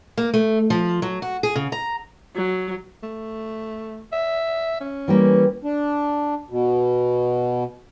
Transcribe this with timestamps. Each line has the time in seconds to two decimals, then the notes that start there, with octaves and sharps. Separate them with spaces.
0.17 A#3
0.34 A3
0.70 F3
1.02 F#3
1.22 F#4
1.43 G#4
1.55 C#3
1.72 A#5
2.36 F#3
3.03 A3
4.12 E5
4.81 C#4
5.08 E3 G3 A#3
5.64 D4
6.50 B2